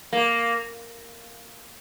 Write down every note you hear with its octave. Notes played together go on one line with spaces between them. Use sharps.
A#3